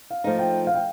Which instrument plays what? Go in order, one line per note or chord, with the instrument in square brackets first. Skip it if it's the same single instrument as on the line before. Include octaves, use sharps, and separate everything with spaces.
[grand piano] F5
[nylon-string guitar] F3 A3 D#4
[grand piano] G5
F5
G5